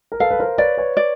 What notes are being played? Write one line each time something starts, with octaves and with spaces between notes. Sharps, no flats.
A#4
A4 B4 F5
B4
A#4 C5
B4 C#5 D5
B4 C#5
D5